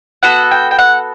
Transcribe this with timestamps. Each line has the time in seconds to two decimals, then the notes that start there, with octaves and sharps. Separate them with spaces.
0.23 B3 F#4 A4 F#5
0.51 G5
0.71 G5
0.79 F#5